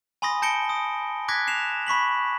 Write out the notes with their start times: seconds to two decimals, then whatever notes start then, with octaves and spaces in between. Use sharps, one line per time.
0.22 G#5 B5 C6 D#6 A#6
0.42 A5 G6 A#6 C#7 D7 G7
0.69 D#6
1.28 D6 F#6 G#6 A#6 B6
1.47 C7 E7 F7
1.87 B5 C#6 B6 F#7